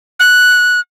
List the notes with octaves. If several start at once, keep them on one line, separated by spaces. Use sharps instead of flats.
F#6